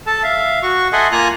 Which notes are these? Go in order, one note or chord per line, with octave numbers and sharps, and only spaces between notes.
A4 A5
E5 F5
F#4 C#6
A4 D#5 E5 F#5 G#5 C6
A#3 F4 G#5 A#5 F#6